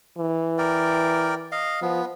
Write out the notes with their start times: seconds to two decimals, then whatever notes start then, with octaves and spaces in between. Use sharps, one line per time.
0.18 E3
0.58 A#4 D5 G5
1.52 D#5 F5
1.82 F3 B3